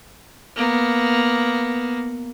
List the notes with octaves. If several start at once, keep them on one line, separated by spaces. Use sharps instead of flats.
A#3 B3